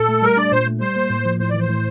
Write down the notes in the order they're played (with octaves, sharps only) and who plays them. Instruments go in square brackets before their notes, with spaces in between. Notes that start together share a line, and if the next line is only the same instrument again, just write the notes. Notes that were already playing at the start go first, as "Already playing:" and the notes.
Already playing: [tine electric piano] A#2 [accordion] A4
[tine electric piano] A3
[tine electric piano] G3 [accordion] A#4
[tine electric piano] D4 [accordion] D5
[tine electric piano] A#2 [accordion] C5
[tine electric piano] A3
[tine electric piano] G3 [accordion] C5
[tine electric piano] A#3
A2
F3
[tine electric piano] A2 [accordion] C5
[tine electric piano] E3 [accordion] D5
[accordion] C5
[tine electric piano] A2